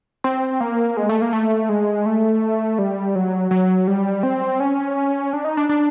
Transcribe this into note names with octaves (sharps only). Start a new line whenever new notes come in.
C4
A#3
G#3
A3
A#3
A3
G#3
A3
G3
F#3
F#3
G3
C4
C#4
D4
D#4
D4
D4